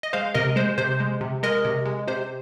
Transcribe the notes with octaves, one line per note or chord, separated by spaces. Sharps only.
D#5
G#3 C5 F5
C3 A#4 D#5
G#3 C5
C3 C5
G#3
C3
G#3 A#4 D#5
C3
G#3
C3 C5